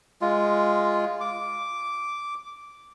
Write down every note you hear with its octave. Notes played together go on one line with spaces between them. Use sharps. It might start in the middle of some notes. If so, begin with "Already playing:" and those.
G#3 F4
D6